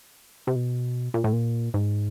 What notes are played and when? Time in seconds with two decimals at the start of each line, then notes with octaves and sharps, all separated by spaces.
0.47 C3
0.56 B2
1.14 A#2
1.24 A2
1.33 A#2
1.74 G#2